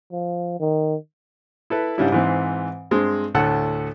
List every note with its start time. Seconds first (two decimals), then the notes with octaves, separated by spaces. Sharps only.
0.12 F3
0.60 D#3
1.70 E4 A4 B4
1.98 G#2 C#3 G3 C#4 D4 E4
2.12 G#2 E3 C4
2.91 G2 G#3 C4
3.35 D2 A2 A4 F#5 E6